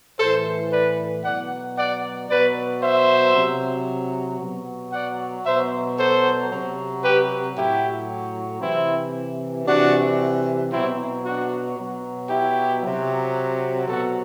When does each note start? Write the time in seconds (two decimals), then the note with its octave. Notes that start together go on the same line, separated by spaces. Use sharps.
0.19 A2 E3 A4 C5
0.72 B4 D5
1.24 B2 F#3 D5 F#5
1.77 D5 F#5
2.29 B2 F#3 B4 D5
2.82 C5 E5
3.35 C3 F#3
4.40 B2 F#3
4.93 D5 F#5
5.45 B2 F#3 C5 E5
5.97 A4 C5
6.51 C3 F#3
7.03 G4 B4
7.56 A2 F#3 E4 G4
8.61 C3 E3 C4 E4
9.66 C3 E3 D4 F#4
10.72 B2 F#3 C4 E4
11.24 D4 F#4
11.77 B2 F#3
12.29 E4 G4
12.82 C3 F#3
13.87 B2 F#3 F#4 A4